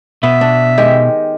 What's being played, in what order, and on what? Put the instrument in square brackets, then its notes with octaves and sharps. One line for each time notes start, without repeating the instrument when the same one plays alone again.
[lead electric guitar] B2 [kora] B3 [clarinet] E5
[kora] D4
D#3 G#3 G4